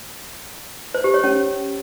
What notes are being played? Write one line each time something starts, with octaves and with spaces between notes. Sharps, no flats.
C5
G4
C#5
C#4